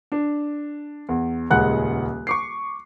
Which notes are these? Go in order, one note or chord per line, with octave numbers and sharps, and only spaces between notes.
D4
E2
D#1 C#2 G#3 F#5 F#6
C#6 D6 C7